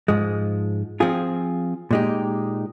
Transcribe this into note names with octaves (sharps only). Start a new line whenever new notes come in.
G#2 F3 G#3
F3 C4 F4 G#4
A#2 G#3 D#4 G4